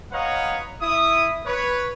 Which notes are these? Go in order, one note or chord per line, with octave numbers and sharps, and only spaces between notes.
B4 C#5 D#5 F5 F#5 A#5
E4 E5 D#6
B4 C#5